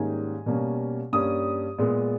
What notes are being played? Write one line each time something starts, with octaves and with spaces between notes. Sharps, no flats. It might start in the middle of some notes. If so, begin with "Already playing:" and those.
Already playing: G#2 D#3 G3 A#3 C#4 G#5
B2 G3 A#3 C#4
G2 G3 A#3 C#4 D#6
A#2 G#3 B3